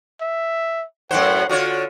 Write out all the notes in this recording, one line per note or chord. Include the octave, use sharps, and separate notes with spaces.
E5
F#2 A2 C5 F#5
D3 F4 F#4 C#5